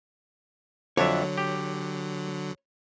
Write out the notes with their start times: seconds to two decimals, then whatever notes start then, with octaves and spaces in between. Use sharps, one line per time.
0.97 F2 D3 F#3 D4 C#5 E5
1.38 G4